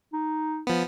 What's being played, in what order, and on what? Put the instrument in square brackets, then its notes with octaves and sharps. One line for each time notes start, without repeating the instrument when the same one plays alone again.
[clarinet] D#4
[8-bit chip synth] F3 B3